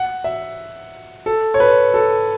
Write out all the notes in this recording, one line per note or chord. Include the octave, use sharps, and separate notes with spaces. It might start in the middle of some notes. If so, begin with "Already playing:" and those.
Already playing: F#5
E5
A4
C#5
B4
A4